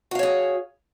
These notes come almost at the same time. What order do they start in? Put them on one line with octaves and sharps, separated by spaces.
F#4 F5 C#5 G#4